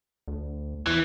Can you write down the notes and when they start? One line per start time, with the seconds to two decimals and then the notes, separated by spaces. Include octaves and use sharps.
0.28 D2
0.87 E2 E3